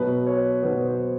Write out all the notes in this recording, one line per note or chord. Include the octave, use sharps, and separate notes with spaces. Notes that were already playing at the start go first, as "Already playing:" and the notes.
Already playing: B2 F#3 B3 B4
C#5
B2 F#3 B3 C5
C5